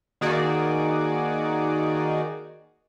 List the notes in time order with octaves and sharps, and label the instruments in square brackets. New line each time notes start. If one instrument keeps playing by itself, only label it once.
[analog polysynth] D#3 A#3 D#4 F#4 G#4 D5